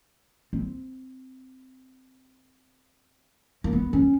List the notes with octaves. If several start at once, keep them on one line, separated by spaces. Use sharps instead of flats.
C4
A#3
B3
C#4